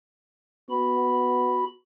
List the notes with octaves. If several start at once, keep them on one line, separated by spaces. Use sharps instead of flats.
B3 F#4 B5